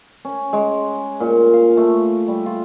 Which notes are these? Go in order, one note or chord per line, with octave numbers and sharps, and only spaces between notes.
C#4
G#3
A#2
F5
A3
G3
F4